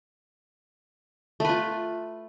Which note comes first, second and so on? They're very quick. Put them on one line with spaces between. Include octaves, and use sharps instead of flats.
A3 B4 F4